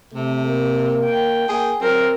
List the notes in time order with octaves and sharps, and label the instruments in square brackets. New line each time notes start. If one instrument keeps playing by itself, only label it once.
[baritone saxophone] C3 [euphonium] A3
[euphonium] A#3
[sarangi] G5
[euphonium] A#3 [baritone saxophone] G#4
[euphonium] F#3 [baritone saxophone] C4 [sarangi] A#4